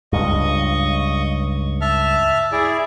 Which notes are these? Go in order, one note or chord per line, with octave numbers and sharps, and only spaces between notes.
C#2 G2 D#5 C#6
E5 A5 F6
E4 G#4 D5